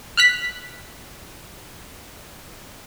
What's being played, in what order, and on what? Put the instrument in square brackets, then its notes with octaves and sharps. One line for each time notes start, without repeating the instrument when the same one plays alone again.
[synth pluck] F6 F#6 B6